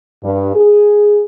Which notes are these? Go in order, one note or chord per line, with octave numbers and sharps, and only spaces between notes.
G2
G#4